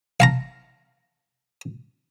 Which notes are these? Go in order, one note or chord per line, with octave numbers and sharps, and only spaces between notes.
F5 A5 A#5